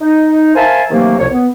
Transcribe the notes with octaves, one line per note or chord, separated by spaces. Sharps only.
D#4
A#4 C5 E5 F5 G#5 A5
C3 D#3 E3 F#3 A3 A#3
C2 F2 C3 C#5
B3